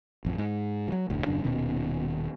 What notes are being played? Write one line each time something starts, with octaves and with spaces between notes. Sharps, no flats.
A1 F2
G#2
E3 F#3
F1 D2 A2
D#1 F#2 C#3 D4
D#1 B2 D#3 C#4